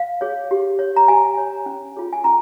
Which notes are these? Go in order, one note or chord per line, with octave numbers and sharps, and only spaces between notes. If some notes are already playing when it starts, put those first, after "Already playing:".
Already playing: F5
G#4 C#5
G4
C#5
A#5
G4 G#5
C#5
C#4
F4 G#4 C#5
G#5
C#4 A#5